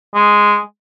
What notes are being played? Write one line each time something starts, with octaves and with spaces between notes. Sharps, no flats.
G#3